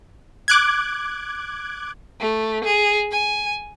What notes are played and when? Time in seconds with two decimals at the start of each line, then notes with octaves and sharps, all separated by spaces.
0.48 D6 F#6 G#6
2.20 A3
2.64 G#4
3.11 G#5